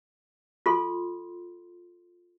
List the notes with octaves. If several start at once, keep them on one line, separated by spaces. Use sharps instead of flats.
F4 A4 C6